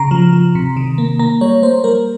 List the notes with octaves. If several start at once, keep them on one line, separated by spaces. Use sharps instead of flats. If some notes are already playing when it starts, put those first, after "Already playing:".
Already playing: C#3 A#5
F3
F3
C3
D#3
A#3
A#3 A#5
G3 C#5
A#3 C5
G3 A#4